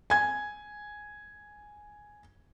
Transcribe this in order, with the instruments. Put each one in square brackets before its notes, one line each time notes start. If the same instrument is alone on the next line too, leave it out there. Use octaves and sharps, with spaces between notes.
[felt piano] G#5 G#6